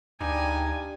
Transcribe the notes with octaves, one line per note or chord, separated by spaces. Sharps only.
D2 G2 D#4 G4 G#4 G#5